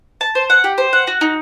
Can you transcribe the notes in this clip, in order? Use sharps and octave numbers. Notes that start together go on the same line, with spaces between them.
A5
C5
F#5
G4
C5
F#5
F#4
D#4